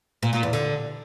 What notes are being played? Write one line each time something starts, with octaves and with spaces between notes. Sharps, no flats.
A#2
A#2
E2
D3